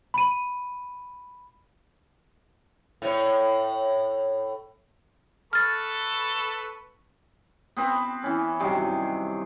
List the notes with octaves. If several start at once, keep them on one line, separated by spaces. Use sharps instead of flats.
B5 D#7
A2 C#5
A4 B4 B5 C#6 F6 A6
B3 C4 B4
E3 C#4
G2 C3 D#3 F#3